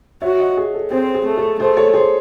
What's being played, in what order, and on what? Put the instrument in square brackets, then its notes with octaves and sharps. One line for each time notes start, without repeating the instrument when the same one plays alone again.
[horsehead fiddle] F#4 [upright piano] C#5 E5
[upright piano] D#5 F#5
G#4
A4
[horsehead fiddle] C4 [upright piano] G#4 C5
[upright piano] G#4
[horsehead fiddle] A3
[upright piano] A4
[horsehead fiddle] A3 [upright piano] G#4 C5
[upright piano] A4 C#5
G#4 C5